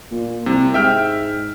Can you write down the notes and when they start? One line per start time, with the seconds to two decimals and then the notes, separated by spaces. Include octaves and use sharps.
0.11 A#2
0.46 C2 C3
0.74 G#2 E5 G5 F6